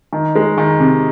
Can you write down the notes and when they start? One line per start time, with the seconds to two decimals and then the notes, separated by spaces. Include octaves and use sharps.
0.13 D#3
0.35 G#3
0.58 D#3
0.80 C3